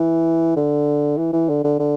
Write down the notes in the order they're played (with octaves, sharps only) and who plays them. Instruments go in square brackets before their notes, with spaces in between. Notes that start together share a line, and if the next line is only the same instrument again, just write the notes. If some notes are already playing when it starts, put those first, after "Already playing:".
Already playing: [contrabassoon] E3
D3
E3
E3
D3
D3
D3